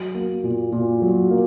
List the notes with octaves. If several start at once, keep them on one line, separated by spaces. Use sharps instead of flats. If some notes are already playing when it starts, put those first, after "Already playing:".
Already playing: F#3
A#3
A#2
A#2
F#3
A#3